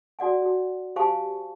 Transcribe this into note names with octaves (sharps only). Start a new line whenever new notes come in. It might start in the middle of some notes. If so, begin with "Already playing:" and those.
F#4 D5 F#5 G#5
F#4
G4 C5 F5 G#5 A5 C#6